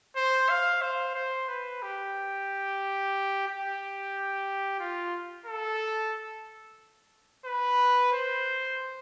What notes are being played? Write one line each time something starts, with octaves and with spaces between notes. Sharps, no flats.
C5
F5
C5
C5
B4
G4
G4
F4
A4
B4
C5